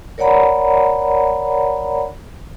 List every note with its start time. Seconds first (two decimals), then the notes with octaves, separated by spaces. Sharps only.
0.18 A#4 C#5 D5 F#5 A#5 B5